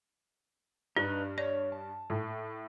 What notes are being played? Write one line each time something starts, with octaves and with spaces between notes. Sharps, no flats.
G2 D4 D#4 B4 F#6
C#5 D5
A5
A2